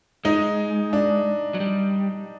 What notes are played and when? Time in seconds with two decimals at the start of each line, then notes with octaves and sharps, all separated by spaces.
0.25 G#3 D#4
0.93 D4
1.55 F#3
1.60 G3